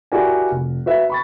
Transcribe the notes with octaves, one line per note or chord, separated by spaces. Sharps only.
E4 F#4 G4 A#4 D5 G#5
F1
F#4 B4 E5 F5
B5 C#6 A6